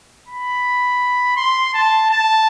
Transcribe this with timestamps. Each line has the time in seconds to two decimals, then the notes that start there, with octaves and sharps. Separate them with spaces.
0.28 B5
1.37 C6
1.74 A5
2.10 A5